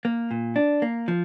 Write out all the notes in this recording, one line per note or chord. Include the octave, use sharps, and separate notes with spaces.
A#3
A#2
D4
A#3
F3